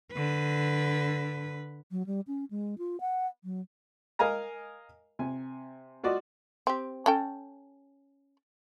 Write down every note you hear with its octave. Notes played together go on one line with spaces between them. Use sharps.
D3 B4
F#3
G3
C#4
G#3
F4
F#5
F#3
A#4 D#5 F5 G#5 A#5
C3 G#5
F4 F#4 D5 D#5
C4 G4
C#4 A4 G5